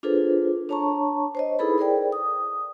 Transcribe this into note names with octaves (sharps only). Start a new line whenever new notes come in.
D4 F4 G#4 A4 B4 C5
D4 C#5 A5 A#5 C#6
C5 C#5 D#5
D#4 E4 G#4 A4 B4 B5
G#4 A#4 C5 D5 G5
D#6